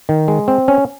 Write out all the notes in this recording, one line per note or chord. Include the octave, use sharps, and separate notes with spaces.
D#3
G#3
C4
C#4